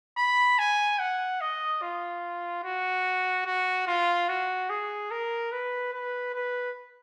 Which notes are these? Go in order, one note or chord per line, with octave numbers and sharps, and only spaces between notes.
B5
G#5
F#5
D#5
F4
F#4
F#4
F4
F#4
G#4
A#4
B4
B4
B4